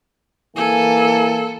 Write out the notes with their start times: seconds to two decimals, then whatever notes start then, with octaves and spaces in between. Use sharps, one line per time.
0.56 E3 A#3 A4 G#5